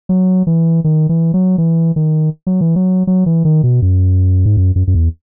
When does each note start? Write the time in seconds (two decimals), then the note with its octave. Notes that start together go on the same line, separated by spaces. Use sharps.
0.09 F#3
0.47 E3
0.84 D#3
1.09 E3
1.34 F#3
1.58 E3
1.96 D#3
2.47 F#3
2.61 E3
2.76 F#3
3.07 F#3
3.26 E3
3.45 D#3
3.63 B2
3.82 F#2
4.46 G#2
4.57 F#2
4.76 F#2
4.87 F#2
4.95 E2